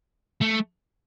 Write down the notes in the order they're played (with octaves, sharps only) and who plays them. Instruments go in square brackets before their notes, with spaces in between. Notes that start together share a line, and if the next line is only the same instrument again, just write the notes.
[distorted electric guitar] A3